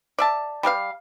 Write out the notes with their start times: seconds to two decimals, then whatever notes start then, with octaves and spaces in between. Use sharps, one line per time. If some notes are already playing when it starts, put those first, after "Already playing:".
0.19 D5 E5 A5
0.63 G3 G4 A#4 F5